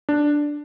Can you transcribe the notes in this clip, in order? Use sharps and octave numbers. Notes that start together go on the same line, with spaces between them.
D4